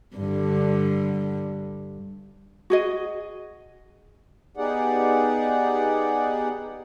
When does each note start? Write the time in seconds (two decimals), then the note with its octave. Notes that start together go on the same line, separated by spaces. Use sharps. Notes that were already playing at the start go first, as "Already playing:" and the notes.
0.16 G2 D3
2.70 F#4 G#4 D#5
4.57 B3 D#4 G4 G#4 D5 F#5